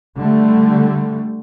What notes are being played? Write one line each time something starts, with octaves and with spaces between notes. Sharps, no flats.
D3 G3 A3